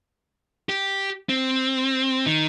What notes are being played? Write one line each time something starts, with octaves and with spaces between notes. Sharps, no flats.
G4
C4
D#3